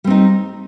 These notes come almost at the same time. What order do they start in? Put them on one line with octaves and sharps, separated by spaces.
G3 C4 D#4